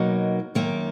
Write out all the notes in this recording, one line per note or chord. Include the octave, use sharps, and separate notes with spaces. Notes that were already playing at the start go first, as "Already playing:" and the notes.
Already playing: B2 F#3 A#3 D#4
F#2 D#3 A#3